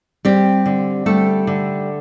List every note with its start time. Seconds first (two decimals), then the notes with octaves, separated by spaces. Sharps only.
0.25 G3 C4 G4
0.66 D3
1.06 G3 A3 A4
1.47 D3